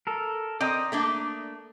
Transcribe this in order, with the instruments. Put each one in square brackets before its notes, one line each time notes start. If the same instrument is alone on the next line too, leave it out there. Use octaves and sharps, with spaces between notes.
[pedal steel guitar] A4 A#4
[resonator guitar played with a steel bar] C4 D#5 [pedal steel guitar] D5 A#5 D#6
[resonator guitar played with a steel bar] A3 A#3 D4